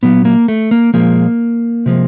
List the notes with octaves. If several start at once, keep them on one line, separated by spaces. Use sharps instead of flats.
A#2 F#3 B3
A#3
A3
A#3
A#2 F3 G#3 A#3
C3 F3 G#3